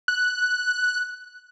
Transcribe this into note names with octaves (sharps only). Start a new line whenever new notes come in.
F#6